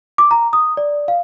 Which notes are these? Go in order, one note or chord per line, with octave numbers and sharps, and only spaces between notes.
D6
A#5
D#6
D5
F5